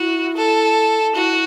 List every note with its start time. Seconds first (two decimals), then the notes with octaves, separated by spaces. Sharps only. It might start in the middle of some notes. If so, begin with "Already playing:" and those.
Already playing: E4 F#4
0.36 A4
1.14 E4 F#4